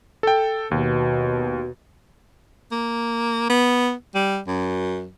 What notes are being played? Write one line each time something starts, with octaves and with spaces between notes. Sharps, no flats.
A4 G5
D#2 B2
A#3
B3
G3
F#2